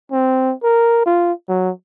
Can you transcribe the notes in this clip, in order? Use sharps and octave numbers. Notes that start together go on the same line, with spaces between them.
C4
A#4
F4
F#3